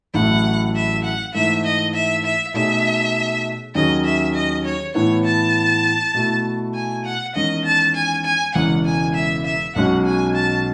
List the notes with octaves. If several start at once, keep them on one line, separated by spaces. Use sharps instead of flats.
A1 A2 F#3 A3 E4 F#5
E5
F#5
G#2 E3 A3 E5
D#5
E5
E5
B2 A3 D#4 G#4 C#5 E5
D#2 D#3 F#3 C#4 G#4 D#5
E5
D#5
C#5
A2 E3 B3 E4 C#5
A5
B2 A3 E4
G#5
F#5
E2 D#3 G#3 C#4 D#5
A5
G#5
G#5
E1 E2 C#3 E3 G#3 F#5
G#5
E5
E5
B1 B2 G#3 C#4 F#4 F#5
G#5
A5